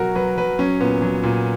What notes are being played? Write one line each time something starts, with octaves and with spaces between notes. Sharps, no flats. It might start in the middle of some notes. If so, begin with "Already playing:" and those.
Already playing: B2 F#3 F#4 A#4
F#3 B4
F#3 B4
F#3 C#4
A#2 B3
F#3
A#2